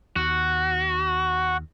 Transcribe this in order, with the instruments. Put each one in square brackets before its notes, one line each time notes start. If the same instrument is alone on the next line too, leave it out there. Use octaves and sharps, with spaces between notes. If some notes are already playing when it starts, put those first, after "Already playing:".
[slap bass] D#2 [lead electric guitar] F#4